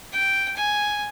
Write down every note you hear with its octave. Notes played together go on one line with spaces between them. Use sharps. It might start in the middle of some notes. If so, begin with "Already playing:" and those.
G5
G#5